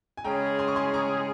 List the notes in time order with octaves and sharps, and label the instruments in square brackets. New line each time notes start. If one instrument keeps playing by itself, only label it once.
[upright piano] G#5
[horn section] C#3 G#3 C#4 G#4 [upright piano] G5 A#5
[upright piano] G#5 C6
C#6
G#5 C6
A#5 C#6